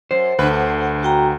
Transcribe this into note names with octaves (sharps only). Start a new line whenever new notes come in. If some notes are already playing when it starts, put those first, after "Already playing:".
F#2 C5
D2 D3 B4
F#4 G5 A#5